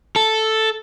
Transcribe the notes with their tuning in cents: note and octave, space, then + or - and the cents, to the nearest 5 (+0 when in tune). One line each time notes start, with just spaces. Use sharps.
A4 +0